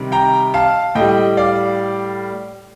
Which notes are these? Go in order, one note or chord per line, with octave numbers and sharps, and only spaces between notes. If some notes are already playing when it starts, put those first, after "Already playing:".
Already playing: C3 D#3 G3
G5 A#5
F5 A5
A2 G3 D#5 G5
D5 F5